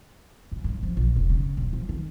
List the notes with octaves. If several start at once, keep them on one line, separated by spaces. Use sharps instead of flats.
F#2
G2
F3
A#1
E1
C#3
D#1
F3
D#3